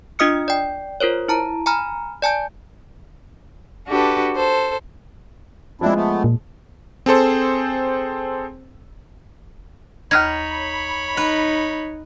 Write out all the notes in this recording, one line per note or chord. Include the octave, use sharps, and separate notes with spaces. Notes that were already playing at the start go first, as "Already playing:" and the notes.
D4 F4 D#5 D#6 F6 C#7
D5 G5
F4 A#4 C5 C#5
E4 A5 A#5
G#5 A#5 B5 F6
D5 G#5 A5 G6
D4 F#4 G4 A4 B4
A4 C5
F3 G#3 C4 D4 E4
A3 B3
A#2
C4 G#4 A4 C5
D#2 D#4 C#5 B5 F6 G#6
D#4 B4